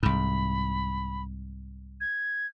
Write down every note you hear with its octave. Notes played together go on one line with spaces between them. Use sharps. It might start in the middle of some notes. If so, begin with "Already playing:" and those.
C2 G#2 B5
G#6